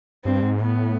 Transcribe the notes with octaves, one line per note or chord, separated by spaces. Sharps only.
G2 C4
G#2
A2 B3